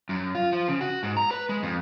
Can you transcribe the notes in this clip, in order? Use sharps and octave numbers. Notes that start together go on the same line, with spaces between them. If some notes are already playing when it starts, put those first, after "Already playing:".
F#2
F4
F3
C#3
F#4
G#2
A#5
B4
G#3
F2